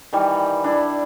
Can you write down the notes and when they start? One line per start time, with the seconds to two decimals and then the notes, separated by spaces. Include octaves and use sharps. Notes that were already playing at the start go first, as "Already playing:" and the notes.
0.13 D#3 E3 G3
0.64 D4 E4 D5